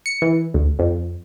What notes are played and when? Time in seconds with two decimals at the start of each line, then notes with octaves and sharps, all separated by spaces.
0.06 C#7
0.22 E3
0.54 D2
0.79 F2